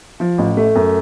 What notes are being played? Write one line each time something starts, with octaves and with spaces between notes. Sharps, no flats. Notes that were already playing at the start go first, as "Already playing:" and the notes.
F3
A1
A3
F#2